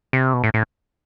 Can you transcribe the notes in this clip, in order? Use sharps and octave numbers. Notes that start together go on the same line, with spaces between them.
C3
B2
A2
A2